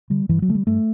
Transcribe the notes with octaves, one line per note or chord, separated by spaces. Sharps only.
D3 G3
G2 E3
F#3
D3 A3
G3
G2 A3